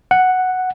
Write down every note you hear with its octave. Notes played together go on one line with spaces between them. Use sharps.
F#5